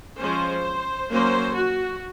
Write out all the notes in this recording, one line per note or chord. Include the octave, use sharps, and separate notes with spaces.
F3 G#3 C#4 C5
F#3 A#3 C#4 C5
F#4